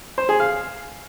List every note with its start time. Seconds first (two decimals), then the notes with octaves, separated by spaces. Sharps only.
0.18 C5
0.29 G#4
0.40 F5